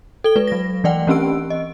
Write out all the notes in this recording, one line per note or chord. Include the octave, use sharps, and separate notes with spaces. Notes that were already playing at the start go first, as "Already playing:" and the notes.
A4 G7
G#3 B4
F#3 A#6
E3 A3 D5 F#5 G5
E3 C4 C#4 G4 E6 D7
D#5